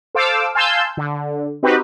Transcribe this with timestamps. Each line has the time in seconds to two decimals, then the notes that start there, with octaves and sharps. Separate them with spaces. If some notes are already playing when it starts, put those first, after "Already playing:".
0.15 A4 C5 F5 D6 E6
0.55 F5 G#5 A5 C6 E6 G6
0.97 D3
1.63 C4 D#4 F#4 G4 B4